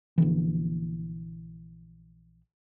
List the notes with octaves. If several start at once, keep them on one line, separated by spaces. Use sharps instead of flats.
A#1 D3 E3